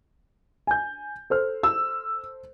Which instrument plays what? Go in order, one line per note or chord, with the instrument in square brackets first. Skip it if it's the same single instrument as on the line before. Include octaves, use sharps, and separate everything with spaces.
[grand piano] G#5 G6
A4 C5 F6
[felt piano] E6